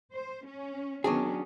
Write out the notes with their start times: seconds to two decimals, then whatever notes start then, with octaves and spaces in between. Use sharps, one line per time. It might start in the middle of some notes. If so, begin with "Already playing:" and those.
0.13 C5
0.46 C#4
1.04 D#3 F#3 B3 C#4 D4 G#4